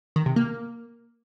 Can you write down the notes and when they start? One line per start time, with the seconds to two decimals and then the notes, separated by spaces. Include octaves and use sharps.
0.16 D#3
0.26 C3
0.36 A#3